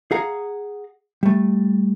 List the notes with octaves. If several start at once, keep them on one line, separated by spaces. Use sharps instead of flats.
G#4 F5 F#5 A#5
G3 A3